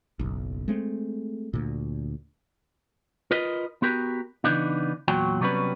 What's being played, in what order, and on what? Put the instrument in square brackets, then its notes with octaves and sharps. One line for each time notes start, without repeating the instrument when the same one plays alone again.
[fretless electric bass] F#1 B1
G#3 A3 C4
D2 A#2
[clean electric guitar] F4 A#4 B4 D#5
B3 F#4 G4 A#4
C#3 E3 F#3 B3 D4 D#4
E2 A#2 F#3 F#4 G5
C3 F#3 G3 B3 C#4 B4